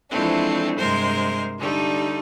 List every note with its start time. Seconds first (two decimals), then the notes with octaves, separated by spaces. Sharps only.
0.11 E3 F3 G#3 A3 C4 D4
0.78 G2 C3 G#3 A#4 C5 C6
1.58 D3 G3 A3 D#4